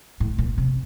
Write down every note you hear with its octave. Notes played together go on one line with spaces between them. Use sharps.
A2
A#2
C3